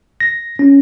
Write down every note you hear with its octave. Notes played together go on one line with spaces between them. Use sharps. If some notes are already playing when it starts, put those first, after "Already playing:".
A#6
C#4